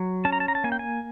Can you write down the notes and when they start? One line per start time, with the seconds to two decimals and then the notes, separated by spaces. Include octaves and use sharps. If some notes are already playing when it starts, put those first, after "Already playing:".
Already playing: F#3
0.25 C#4 A5
0.32 A#5
0.40 A5
0.48 A#5
0.55 A5
0.64 A#3 G#5
0.72 G5
0.79 G#5